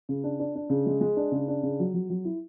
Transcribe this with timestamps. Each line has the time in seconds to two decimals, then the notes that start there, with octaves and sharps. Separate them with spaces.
0.09 C#3
0.24 D4
0.40 D4
0.55 D4
0.70 C#3
0.86 G#3
1.01 G#3
1.17 D4
1.32 C#3
1.48 D4
1.63 C#3
1.79 F#3
1.94 F#3
2.10 F#3
2.25 E4